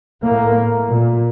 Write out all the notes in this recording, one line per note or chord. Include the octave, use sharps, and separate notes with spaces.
A2 A#3
A#2